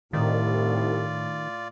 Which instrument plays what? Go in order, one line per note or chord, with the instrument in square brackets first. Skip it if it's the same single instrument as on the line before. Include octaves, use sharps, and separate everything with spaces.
[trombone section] C2 [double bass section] A2 [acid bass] D#3 [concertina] F4 D5